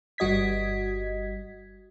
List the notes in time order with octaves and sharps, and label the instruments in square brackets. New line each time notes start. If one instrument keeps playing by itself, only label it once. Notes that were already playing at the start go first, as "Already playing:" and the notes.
[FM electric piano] G1 G3 F#4 D#5 G#6 B6